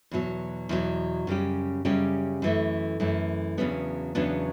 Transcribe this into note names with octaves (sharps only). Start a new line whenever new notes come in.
E2 B2 F#3
E2 B2 F#3
F#2 C#3 G3 C#4 G4
F#2 C#3 G3 C#4 G4
F#2 E3 A3
F#2 E3 A3
E2 C#3 F#3 B3 D4
E2 C#3 F#3 B3 D4